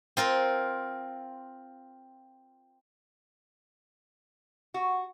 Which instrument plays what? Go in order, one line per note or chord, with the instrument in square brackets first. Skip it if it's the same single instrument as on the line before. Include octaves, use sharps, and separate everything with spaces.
[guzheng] C4 F4 A#4
[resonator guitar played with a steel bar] F#4